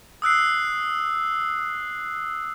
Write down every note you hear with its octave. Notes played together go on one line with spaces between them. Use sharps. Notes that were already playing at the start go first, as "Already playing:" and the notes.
D#6 E6 F#6 C7